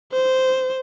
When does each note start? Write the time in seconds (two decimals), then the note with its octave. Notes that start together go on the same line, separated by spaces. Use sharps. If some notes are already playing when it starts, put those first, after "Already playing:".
0.12 C5